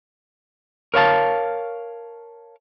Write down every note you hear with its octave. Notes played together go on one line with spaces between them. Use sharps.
A#4 C#5 F5 A5